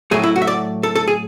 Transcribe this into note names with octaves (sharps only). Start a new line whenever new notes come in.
A2 F#3 A3 G#4
E4
F#4
E5
D5
A4
A4
G#4